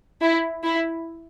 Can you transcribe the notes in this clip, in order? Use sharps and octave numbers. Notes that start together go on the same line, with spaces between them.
E4
E4